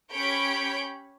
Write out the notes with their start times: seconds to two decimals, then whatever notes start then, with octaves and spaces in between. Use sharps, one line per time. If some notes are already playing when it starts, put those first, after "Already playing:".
0.11 C#4 G4 C#5 B5 G6 D7